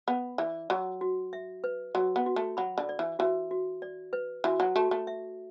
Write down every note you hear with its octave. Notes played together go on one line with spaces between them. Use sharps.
B3 B5
E3 D5
F#3 F#4
F#4
E5
B4
F#3 F#4
B3
F#4
A3
F#3 B5
D3
D5
E3
E3 F#4
F#4
D5
B4
E3 F#4
F#3
A3 F#4
A3
E5